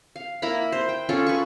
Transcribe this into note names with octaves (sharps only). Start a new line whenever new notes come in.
F5
A#3 E4 A#5 B5
B4 C5
G5
C#4 F4 G#4 A4
B4 G#5 C#6